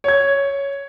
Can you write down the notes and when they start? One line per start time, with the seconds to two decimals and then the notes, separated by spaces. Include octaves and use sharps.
0.04 C#5 G#6